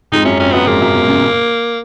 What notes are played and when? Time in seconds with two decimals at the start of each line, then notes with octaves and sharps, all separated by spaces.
0.12 F2 G#2 D#4
0.25 F#2 C#4
0.40 F2 C#4
0.53 F#2 B3
0.67 F2 G#2 A#3
0.80 F#2 A#2
0.94 G#2 B2
1.08 A#2 C#3